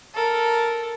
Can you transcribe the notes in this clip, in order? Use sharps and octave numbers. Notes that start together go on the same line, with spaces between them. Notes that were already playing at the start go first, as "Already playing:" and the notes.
A4 A#4